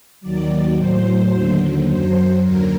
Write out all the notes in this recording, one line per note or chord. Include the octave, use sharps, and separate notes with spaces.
D#2 D#3 F#3 D5
A2 F#3 C5
D#2 D3 F#3
F#2 F#3 C5
D#2 D3 F#3 A#4